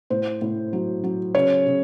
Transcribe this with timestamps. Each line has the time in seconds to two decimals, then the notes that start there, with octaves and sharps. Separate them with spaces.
0.10 A2 C5
0.42 A2
0.73 F#3
1.04 F#3
1.35 C#3 C#5
1.66 C#3